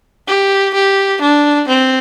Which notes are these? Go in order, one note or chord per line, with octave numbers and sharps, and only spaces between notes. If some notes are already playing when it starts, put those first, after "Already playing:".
G4
G4
D4
C4